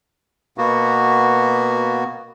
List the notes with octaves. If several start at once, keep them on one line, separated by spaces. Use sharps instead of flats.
B2 A#3 B3 F#4